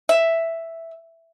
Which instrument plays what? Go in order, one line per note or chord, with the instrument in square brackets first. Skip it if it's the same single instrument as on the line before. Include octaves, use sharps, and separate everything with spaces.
[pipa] E5